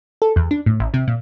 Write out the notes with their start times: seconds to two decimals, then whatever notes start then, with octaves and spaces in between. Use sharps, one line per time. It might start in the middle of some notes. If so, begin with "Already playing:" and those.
0.22 A4
0.36 E2
0.51 D4
0.66 A2
0.80 A1
0.94 C3
1.08 A#2